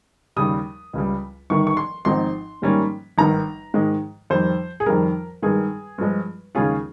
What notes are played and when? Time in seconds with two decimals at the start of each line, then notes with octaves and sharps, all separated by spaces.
0.36 D#2 C#3 G3 D#6
0.93 C#2 C#3 G3
1.50 G1 G2 D#3 C#6
1.67 C#6
1.77 C6
2.05 G#1 G#2 F3 C4 D#4 C6
2.62 G#2 D#3 G3 A#3 C#4
3.18 G#1 G2 D#3 A#5
3.74 G#2 D#3 G#3
4.30 F2 D#3 G3 C5
4.80 G#4
4.86 F2 D#3 G3 A#4
5.42 G2 D#3 G#3 G#4
5.98 G2 F3 G#3
6.55 D#2 C#3 G#3 C#4 F4 G#4